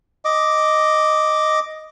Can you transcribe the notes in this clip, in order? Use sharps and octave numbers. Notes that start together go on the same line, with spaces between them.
D#5 D6